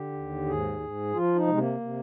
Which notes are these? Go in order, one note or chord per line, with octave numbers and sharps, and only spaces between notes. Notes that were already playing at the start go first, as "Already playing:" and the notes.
Already playing: D3 G4
D#2
G#2 G#4
G#2
F3 F4
D#4
C3 G#3
A#3
C3